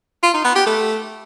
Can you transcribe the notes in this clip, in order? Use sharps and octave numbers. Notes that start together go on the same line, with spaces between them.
F4
D#4
B3
G4
A3